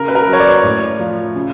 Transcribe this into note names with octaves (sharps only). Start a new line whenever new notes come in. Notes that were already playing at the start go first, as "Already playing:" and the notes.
Already playing: C#3 A#4
B4
A#4
F#3
C#5
D5
A2
F3
C#3